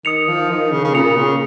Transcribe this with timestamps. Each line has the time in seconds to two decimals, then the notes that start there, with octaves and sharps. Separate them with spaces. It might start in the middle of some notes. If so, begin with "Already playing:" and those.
0.05 D#3 D#6 C#7 F7
0.28 F3
0.50 D#3
0.72 C#3
0.84 C#3
0.94 A#2 D#6 C#7 F7
1.17 C#3